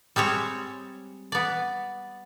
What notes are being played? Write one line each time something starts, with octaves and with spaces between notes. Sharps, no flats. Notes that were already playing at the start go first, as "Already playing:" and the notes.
G3 G#3 C4 C#5
B3 D5